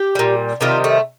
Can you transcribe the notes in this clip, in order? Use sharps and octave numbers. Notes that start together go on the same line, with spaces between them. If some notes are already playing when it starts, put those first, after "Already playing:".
Already playing: G4
A#2 G3
C3 D#3 G3 F4
A3